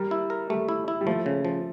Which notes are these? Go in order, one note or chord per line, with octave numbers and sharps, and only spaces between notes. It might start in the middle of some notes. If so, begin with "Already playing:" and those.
Already playing: G3 A#4
E4
A#4
G3 A3
E4
E4
G3
F3 A3
C#3
F3